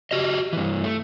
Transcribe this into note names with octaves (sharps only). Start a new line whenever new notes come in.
F#4 G4 D#5
G2 E3
A3